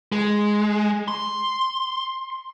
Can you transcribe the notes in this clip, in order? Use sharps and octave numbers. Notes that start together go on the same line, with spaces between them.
G#3
C6